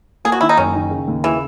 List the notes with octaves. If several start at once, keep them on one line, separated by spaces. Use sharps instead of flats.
A#3 G#4
F#4
D#3 E4
D#4
F#1 C#4
D#3
C#3
D#2
C#3 E3